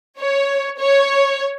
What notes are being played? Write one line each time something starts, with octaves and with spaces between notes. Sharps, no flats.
C#5
C#5